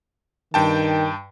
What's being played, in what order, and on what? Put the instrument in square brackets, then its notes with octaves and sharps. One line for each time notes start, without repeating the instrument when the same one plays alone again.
[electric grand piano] G2 G5 A5 [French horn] D#3